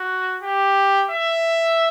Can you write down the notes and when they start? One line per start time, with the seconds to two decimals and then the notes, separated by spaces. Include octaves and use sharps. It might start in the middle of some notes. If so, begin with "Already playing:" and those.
Already playing: F#4
0.42 G4
1.11 E5